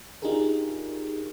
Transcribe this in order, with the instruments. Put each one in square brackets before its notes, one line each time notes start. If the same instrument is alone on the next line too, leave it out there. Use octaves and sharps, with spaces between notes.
[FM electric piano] D4 D#4 F4 G4 G#4 A#4